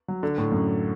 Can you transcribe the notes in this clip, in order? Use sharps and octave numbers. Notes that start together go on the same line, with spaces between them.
F#3
D3
A2
F#2